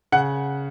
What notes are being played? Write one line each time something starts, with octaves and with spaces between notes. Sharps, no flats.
C#3 F#5